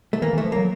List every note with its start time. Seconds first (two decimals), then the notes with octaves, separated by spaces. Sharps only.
0.13 A3
0.22 E3 A#3
0.33 E3
0.38 A3
0.44 F3
0.52 F#3 A#3